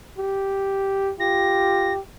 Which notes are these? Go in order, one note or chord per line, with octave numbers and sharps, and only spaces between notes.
G4
F4 G4 A#6